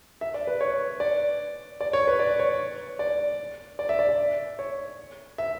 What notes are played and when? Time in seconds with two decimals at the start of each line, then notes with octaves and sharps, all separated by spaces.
0.21 E5
0.34 D5
0.47 B4
0.61 C#5
1.00 D5
1.81 D5
1.93 C#5
2.07 B4
2.19 D5
2.40 C#5
2.99 D5
3.79 D5
3.89 E5
3.99 D5
4.09 D5
4.59 C#5
5.38 E5